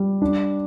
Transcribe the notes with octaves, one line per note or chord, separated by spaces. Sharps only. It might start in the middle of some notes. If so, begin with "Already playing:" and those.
Already playing: G3
D4